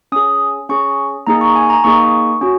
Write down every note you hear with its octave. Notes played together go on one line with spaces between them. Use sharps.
C#4 G#4 D#6
C#4 G#4 C#6
A#3 D#4 G#4 A#5
C#6
G#5
A#5
A#3 D#4 G#4 C#6
C#4 F#4